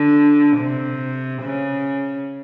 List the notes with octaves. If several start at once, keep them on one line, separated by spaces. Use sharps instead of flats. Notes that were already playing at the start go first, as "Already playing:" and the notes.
Already playing: D3
C3
C#3